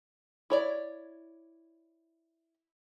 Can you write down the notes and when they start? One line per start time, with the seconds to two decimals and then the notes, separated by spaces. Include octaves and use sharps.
0.50 E4 C#5 D5